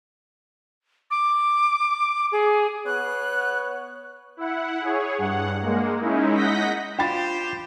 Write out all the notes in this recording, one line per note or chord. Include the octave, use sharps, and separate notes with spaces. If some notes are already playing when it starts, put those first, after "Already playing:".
D6
G#4
B3 C#5 F#6
E4 F#5
G#4 C#5
G2 F#5
G#3 A#3
G#3 C#4 D#4 E4
D#5 F#5 G6 A#6 B6
D4 F4 G4 C5 F5 G5 B5 A6